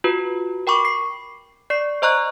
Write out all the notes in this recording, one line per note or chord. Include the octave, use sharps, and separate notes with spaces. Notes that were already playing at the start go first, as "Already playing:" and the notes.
F4 F#4 B4
A#4 G5 B5 C#6 D6
C7
D5 C#6 C7
C5 D#5 A#5 C#6 F#6